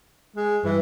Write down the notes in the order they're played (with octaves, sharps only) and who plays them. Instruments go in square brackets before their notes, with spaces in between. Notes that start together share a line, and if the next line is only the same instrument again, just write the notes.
[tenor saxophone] G#3
[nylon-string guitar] G2 [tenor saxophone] E3